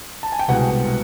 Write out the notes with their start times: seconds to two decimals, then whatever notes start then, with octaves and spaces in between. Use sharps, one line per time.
0.23 A5
0.32 G#5
0.39 G5
0.48 C2 B2 G#3 F#5